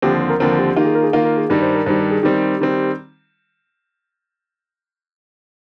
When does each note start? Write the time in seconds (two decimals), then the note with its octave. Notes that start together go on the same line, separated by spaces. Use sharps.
0.02 D#2 D3 F3 C4 G4
0.21 C5
0.30 A#4
0.40 D#2 D3 F3 C4 A#4
0.59 G4
0.76 D#3 A#3 F4 G4
0.86 G#4
0.95 A#4
1.04 G#4
1.13 D#3 A#3 F4 A#4
1.25 A#4
1.37 G#4
1.50 G2 D#3 G3 A#4
1.62 C5
1.75 A#4
1.86 G2 D#3 G3 C5
2.00 A#4
2.11 G#4
2.23 D#3 G3 C4 G4
2.60 D#3 G3 C4